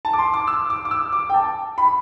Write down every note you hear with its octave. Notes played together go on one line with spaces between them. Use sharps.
A5
D6
C6
D6
E6
D6
D6
E6
D6
G5
A5
B5